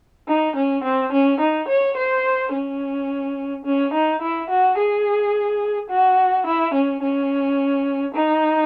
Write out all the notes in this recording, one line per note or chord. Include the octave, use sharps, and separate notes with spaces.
D#4
C#4
C4
C#4
D#4
C#5
C5
C#4
C#4
D#4
E4
F#4
G#4
F#4
E4
C#4
C#4
D#4